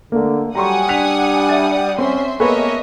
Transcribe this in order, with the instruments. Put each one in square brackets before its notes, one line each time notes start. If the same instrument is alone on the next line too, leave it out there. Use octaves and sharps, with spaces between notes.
[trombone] D3 [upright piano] A3 A#3
[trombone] F#3 [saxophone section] G3 [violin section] F#5 G#5 D#6 [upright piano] A#5 C6 C#6
[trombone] D4 [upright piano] F#6 B6 F7
[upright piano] E5 A6 D#7
[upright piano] C4 [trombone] C#4 [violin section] E5 C6
[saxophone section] G#3 C#5 [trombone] A#3 [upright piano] B3 A4 B4 [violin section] D#5 E5